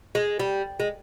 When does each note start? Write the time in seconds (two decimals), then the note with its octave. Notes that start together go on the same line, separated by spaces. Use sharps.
0.15 G#3
0.39 G3
0.80 G#3